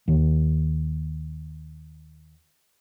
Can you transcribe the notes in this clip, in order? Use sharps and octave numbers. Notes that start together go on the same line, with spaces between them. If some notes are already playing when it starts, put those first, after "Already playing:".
D#2 D#3